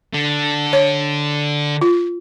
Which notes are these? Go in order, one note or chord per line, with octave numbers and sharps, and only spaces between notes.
D3
C#5
F4